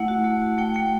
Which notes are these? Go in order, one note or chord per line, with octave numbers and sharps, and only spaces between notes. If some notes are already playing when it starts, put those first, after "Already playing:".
Already playing: A3 E4 F#5
F#4
A3
F#4
A3 G5
A3 G5